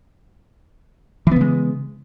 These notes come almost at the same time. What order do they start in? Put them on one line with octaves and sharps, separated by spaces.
E3 B3 C#3 G#3